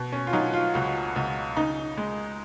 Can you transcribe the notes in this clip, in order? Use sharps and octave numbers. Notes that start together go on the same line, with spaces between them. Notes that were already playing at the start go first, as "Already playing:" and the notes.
Already playing: B2
C#4
F4
F#3 D#4
F4
C#2 F#4
C#2
C#3 D#4
G#3